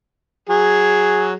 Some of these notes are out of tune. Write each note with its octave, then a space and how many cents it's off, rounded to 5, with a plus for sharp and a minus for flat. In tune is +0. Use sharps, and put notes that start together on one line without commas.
F#3 +0 G#4 +0